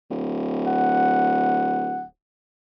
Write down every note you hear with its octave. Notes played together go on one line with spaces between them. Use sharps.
D1
F#5